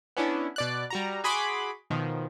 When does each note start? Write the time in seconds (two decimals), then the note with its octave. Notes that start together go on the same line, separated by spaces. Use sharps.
0.17 B3 C#4 D4 E4
0.56 B2 D5 F#6
0.90 G3 F#4 A#5
1.24 F#4 G#4 B5 C6 D6
1.90 B2 D#3 F3